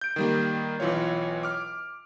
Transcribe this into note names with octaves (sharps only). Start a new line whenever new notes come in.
G6 D7
D#3 G3 A#3
B1 E3 F4 C#5
D6 F6